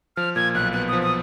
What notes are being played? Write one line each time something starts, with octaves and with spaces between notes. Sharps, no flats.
F3 F6
A#2 G#6
B1 F#6
B3 F#6
F3 D#6
D#6